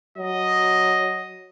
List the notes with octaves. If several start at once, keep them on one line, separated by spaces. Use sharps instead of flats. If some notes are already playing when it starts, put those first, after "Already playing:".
F#3 D#5